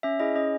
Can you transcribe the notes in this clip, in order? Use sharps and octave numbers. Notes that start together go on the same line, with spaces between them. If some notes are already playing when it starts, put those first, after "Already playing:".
C#4 E5
E4 G#4 D#5
C#4 D#5